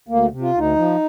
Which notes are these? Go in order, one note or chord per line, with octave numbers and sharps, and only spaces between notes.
D2 A#3
C3
F4
D2 D#4
F3